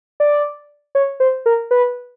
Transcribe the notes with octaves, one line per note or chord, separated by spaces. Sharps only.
D5
C#5
C5
A#4
B4